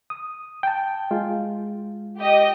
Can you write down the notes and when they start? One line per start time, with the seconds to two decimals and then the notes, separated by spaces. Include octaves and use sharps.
0.10 D#6
0.63 G5 A5
1.11 G#3 F4
2.18 G4 D#5